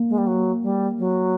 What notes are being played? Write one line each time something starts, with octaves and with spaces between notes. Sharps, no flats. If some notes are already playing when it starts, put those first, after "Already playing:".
Already playing: A#3
G#3
G3
F#3
G3
F#3